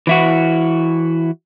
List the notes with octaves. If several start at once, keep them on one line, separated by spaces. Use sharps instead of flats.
E3 E4 F#4